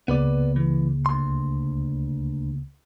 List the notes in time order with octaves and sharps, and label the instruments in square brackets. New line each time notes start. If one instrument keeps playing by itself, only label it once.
[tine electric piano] C#2 C#3 A#3 [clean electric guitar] B3 B4 D5
[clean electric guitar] E3
D2 C6